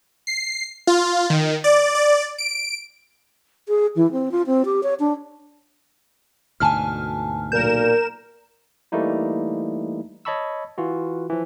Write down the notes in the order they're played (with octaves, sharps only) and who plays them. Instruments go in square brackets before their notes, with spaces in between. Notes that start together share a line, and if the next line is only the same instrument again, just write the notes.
[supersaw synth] C7
F4
D#3
D5
D5
D7
[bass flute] G#4
E3
C4
F4
C4
G4
C#5
D4
[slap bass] D2 G#2 B2 [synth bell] G#5 A5 F6
[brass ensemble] B1 A#2 [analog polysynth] A#4 E7 [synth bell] G6
[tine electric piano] E3 G3 A3 A#3 D#4 E4
C#5 D#5 A5 B5 C#6 E6
E3 F4 F#4
E3 F3